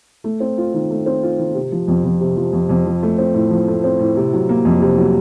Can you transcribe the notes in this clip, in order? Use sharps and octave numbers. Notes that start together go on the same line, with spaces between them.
A3
C4
F4
D#3
A3
C4
F4
D#3
C3
F3
F2
F2
C3
F3
F2
F2
F3
A3
C4
A2
F3
A3
C4
A2
C3
F#3
A#3
F2
C3
F#3